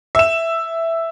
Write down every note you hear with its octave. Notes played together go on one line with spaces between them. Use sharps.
E5 E7